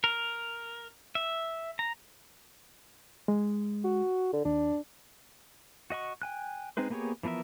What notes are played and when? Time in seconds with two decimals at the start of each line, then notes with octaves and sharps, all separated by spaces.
0.04 A#4
1.15 E5
1.79 A#5
3.28 G#3
3.84 F#4
4.33 D3
4.45 D#2 D4
5.90 F#4 D#5 F#5 C#6
6.22 G5 G#5 F#6
6.77 G#3 C4 D#4 B4 C5
6.90 A#3 B3 G4 G#4 C#5
7.23 E3 F3 B3 A#4 E5